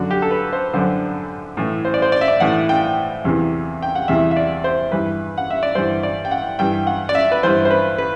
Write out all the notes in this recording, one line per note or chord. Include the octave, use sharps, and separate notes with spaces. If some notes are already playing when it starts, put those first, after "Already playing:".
Already playing: F#2 D3 F#4
G4
A4
B4
C5
F#2 D3 C5
A2 E3
C5
D5
C5
D5
E5
D5
A2 E3 F#5
G5
E2 C3 E3
G5
F#5
E2 C3 E3 E5
E5
D5
C5
G2 E3 B4
F#5
E5
D5
G2 E3 C5
D5
G5
F#5
G2 E3 G5
F#5
D5
E5
B4
G2 E3 C5
C5
B4
B4